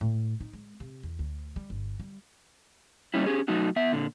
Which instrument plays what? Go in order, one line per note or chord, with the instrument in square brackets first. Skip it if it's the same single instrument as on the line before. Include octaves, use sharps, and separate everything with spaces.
[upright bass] A2
D#4
G#3
C3
E2
D2
G3
G1
G3
[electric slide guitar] G3 A#3 C#4 D#4 E4
C#4 G4 G#4
F#3 A3 D#4 F#4
B3 E5
A#2 D3